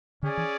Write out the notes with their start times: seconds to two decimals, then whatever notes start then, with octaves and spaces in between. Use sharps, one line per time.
0.22 D3 C#4 G#4 D5
0.37 E3